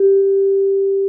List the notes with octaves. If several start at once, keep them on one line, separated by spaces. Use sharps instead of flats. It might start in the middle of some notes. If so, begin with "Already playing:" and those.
Already playing: G4